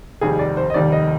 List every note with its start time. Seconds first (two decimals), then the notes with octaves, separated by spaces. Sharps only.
0.21 F1 D#2 D#3 G3 G#4
0.39 D5
0.57 C5
0.70 D#5
0.74 F1 D#2 D#3 G3 D5
0.92 D#5